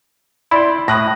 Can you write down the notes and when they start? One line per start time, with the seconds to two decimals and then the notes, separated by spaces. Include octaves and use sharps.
0.51 E4 D5 G5 B5 C6
0.88 A2 D#6 F#6 A#6